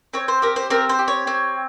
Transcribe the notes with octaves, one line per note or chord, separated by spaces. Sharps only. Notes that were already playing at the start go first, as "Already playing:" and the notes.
C4 C#5
C5
G4 A#4
C5
C4 A#4
C5
G4
C#5
C4